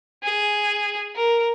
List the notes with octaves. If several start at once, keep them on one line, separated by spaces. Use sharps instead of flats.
G#4
A#4